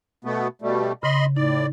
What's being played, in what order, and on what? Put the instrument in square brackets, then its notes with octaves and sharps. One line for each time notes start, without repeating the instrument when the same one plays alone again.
[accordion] B2 A3 B3
B2 G3 A3
[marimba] C#3 [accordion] D#5 B5 C6
[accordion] A2 D5 [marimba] D#4